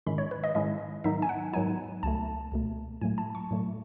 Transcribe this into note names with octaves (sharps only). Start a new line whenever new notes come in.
G#2 D#3 G#3 C#4 E4 B5
C#5
B4
D#5
G#2 D#3 G#3 C#4 E4 D#5
G#2 D#3 F#3 B3 D#4 E5
G#5
F#5
G#2 D#3 F#3 B3 D#4 G#5
C#2 B2 A3 A5
C#2 B2 A3
A2 F#3 A3 G#5
A5
C#6
A2 F#3 A3